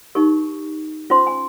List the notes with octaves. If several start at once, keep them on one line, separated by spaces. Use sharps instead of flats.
D#4 G4 A#4 C#6
C#4 F4 C5 C6
G#5